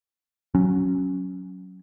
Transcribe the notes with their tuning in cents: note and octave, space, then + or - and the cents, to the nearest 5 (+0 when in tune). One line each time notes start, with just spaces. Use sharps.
F#3 +0 C#4 +0